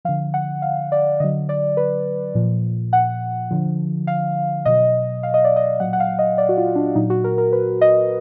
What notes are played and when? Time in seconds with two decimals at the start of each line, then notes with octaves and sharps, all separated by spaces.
0.05 D3 F3 F5
0.34 F#5
0.62 F5
0.92 D5
1.20 D3 F#3 D#5
1.49 D5
1.77 B4
2.35 A#2 F3
2.93 F#5
3.51 D3 F3
4.07 F5
4.65 B2 F#3 D#5
5.23 F5
5.34 D#5
5.44 D5
5.56 D#5
5.80 A#2 F#3 F#5
5.93 F#5
6.00 F5
6.19 D#5
6.38 D5
6.49 F#4
6.58 F4
6.76 D4
6.95 A#2 F#3 D#4
7.10 F#4
7.24 A#4
7.38 A#4
7.53 B4
7.81 D#5